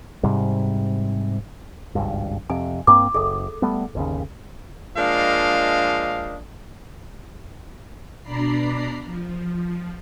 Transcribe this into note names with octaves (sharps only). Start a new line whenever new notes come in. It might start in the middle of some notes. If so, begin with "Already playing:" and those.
G#2 C3 G3
G#1 C#2 G2
F2 C3 G#5
G2 A#3 C4 D6
F#1 G#4 A4
G3 A3 B3
G1 D#2 C#3
F3 G#3 A#3 D4 D#5 F5
B2 D4 D5 A#5 B5 C7
F3